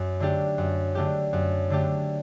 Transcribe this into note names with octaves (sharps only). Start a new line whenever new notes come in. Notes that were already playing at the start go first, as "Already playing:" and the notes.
Already playing: F#2
D3 A3 D4 G4
F#2
D3 A3 D4 G4
F#2
D3 A3 D4 G4